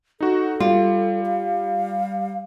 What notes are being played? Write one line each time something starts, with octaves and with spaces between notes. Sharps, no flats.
D#4 F#4 A4
G3 F4
F5